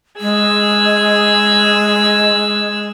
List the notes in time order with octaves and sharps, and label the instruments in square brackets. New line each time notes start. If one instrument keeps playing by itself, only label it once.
[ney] G#3 [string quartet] G#4 E6